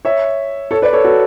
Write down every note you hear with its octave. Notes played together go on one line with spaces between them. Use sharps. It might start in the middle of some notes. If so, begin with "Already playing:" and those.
C#5 E5
A4 C#5
B4 D5
A4 C#5
F#4 A4